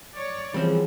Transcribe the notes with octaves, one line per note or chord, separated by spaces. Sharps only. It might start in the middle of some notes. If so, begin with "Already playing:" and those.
C#5 D5
E3 F3 G3 C4 C#4 G#4 A#4 F#5